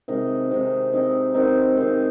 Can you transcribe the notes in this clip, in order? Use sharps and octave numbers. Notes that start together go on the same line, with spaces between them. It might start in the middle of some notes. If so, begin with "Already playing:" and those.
C3 D#3 G#3 D#4
C3 D#3 G#3 D#4
D#3 C4 D#4
D#3 C4 D#4
D#3 C4 D#4 G#4